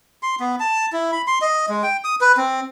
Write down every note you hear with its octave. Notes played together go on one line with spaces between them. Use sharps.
C6
B3
A5
E4
B5
C6
D#5
G#3
G5
D#6
B4
C4